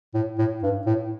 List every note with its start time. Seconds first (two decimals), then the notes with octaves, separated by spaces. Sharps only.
0.14 A2
0.38 A2
0.63 G2
0.86 A2